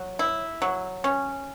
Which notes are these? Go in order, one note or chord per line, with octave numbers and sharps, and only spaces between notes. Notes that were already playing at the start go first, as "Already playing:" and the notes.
Already playing: F#3
E4
F#3
C#4